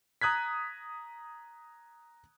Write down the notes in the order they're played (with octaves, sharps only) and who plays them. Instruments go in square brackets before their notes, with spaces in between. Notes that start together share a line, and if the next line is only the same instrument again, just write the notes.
[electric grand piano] A#5 D#6 F#6 G#6 B6